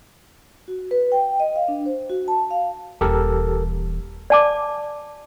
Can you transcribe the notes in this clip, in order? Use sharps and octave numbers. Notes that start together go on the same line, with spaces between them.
F#4
B4
G5
D#5
F5
D4
C5
F#4
A5
F5
D#1 E3 G4 A4 A#4
D5 A5 D6